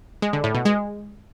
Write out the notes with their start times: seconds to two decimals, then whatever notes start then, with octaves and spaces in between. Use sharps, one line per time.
0.22 G#3
0.33 D3
0.44 A2
0.55 B2
0.65 G#3